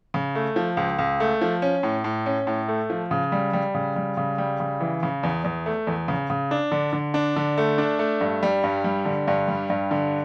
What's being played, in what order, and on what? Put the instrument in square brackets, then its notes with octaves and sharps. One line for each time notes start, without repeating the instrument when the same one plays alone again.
[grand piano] C#3
A3
F3
C#2
C#2
A3
F3
C#4
A2
A2
C#4
A2
A3
F3
C#3
G3
G3
C#3
G3
C#3
G3
C#3
E3
C#3
E2
E2
A3
E2
C#3
C#3
D4
D3
D3
D4
D3
A3
D4
A3
G2
G3
G2
G3
D3
G2
G3
G2
D3